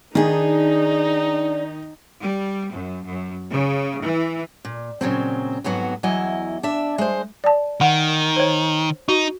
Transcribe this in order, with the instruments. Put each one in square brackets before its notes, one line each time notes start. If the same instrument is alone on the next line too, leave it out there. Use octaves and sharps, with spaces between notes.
[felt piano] D#3 [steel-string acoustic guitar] D4 G#4 [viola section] D#4
[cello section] G3
F#2
F#2
C#3
E3
[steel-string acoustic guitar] A#2
A#2 C#3 F#3 C4
F2 G#2 F#3 B3 F#4
E2 F#3 E4 D#5 G#5
D4 E5
G#3 C5
[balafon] D5 A5
[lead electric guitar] D#3 [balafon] F#5
[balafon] C5 C#5
[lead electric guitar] D#4 [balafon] F#4